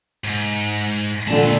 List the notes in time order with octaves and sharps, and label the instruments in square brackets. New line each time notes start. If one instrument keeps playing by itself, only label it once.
[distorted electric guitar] G#2
[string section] A#2 D3 [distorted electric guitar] G#3 A5